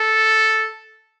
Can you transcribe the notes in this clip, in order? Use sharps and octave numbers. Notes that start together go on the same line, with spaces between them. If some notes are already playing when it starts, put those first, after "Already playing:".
Already playing: A4